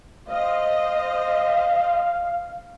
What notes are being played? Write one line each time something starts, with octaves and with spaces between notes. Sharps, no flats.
C5 D#5 F5